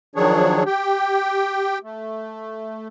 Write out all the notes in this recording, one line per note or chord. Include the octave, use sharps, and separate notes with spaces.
D#3 F3 F#3 D4 G#4 C#5
G4 G5
A3